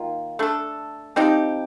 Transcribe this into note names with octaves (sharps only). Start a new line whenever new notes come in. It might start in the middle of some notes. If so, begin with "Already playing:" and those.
Already playing: D#3 A#3 F4
A3 D4 A4
F3 C4 D#4 G4